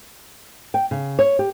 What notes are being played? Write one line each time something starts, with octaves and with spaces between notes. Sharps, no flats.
G5
C#3
C#5
G4